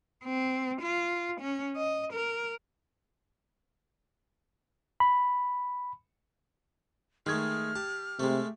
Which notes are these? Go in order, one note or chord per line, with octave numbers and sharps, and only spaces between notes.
C4
F4
C#4
D#5
A#4
B5
D#3 G#3 A3 D#6 F6 G#6
G4 A5
C3 G#3 A3